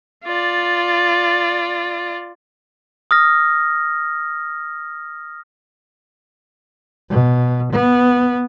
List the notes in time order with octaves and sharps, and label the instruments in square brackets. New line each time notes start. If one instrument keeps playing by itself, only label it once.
[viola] F4 D5
[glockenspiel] D#6 F6 A#6
[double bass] B2
B3